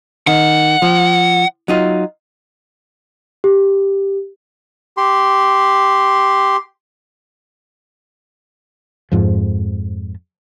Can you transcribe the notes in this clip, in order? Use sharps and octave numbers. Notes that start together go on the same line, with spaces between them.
D#3 F#5
F3
F#3 D#4 F4
G4
G4 C6
F2 G#2 F3